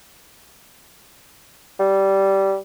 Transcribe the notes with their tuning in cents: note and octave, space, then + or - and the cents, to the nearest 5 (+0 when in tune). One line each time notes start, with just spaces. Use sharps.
G3 -15